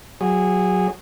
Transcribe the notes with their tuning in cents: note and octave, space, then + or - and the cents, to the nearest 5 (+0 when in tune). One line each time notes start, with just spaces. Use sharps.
F#3 +0 G#4 -20